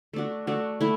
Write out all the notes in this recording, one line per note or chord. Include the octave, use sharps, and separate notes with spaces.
A3 D4 F#4
A3 D4 F#4
A3 E4